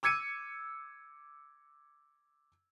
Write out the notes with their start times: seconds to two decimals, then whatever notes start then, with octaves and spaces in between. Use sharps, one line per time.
0.03 D6 E6 G#6 C#7 D#7